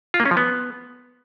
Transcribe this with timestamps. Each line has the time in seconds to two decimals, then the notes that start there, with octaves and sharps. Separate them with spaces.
0.14 F4
0.20 A#3
0.25 C#4
0.31 F3
0.37 B3